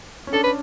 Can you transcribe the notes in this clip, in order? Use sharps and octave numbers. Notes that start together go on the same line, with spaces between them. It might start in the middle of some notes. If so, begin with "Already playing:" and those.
C#4
D4 A4
B4